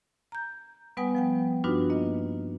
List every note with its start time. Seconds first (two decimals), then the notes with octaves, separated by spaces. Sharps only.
0.32 A#5 G6
0.97 G3 B3 B4 F#5 G#5 D#6
1.15 F3 F#5 G5
1.64 G2 D4 D#4 F4 F#4 B4
1.90 A#3 D#5